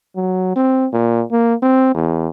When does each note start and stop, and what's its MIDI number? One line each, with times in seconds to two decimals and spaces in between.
0.16 0.53 54
0.56 0.87 60
0.93 1.23 46
1.31 1.54 58
1.62 1.94 60
1.94 2.28 40